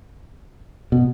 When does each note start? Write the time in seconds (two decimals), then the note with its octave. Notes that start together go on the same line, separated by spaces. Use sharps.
0.92 B2